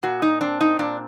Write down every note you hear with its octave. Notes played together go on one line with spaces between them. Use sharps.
A#2 F#4
D#4
C4 D4
D#4
A#2 D4